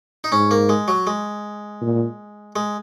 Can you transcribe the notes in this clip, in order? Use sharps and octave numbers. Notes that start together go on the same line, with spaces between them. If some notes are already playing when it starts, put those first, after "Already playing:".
D#4
G#2 C#4
A#3
G#3
F#3
G#3
A#2
G#3